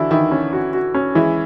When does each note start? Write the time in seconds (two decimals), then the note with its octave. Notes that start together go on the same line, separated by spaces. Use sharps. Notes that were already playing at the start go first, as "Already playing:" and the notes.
Already playing: D3 E3 D4 E4 F#4
0.11 D#3 E3 E4
0.31 C#4
0.53 F#4
0.73 F#4
0.94 C#4
1.15 E3 G#3 E4